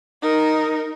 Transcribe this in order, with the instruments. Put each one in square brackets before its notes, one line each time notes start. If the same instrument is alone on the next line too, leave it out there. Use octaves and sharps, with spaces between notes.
[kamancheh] D#4 A#4